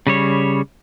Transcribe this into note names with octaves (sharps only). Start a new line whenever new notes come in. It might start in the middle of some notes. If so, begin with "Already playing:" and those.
C#3 G3 C#5